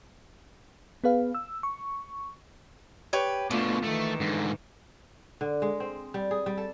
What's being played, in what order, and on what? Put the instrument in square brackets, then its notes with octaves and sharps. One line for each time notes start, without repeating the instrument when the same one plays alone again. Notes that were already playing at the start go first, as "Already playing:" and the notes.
[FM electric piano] B3 G#4 B4 F5
E6
C#6
[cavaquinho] G4 B4 C#5
[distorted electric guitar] B2 D3 [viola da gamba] A3 F4 [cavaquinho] D6
[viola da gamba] D#3 E3 [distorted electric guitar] A3
[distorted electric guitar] G#2 D3
[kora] D3
G#3
C4
G3
G#4
G3
A4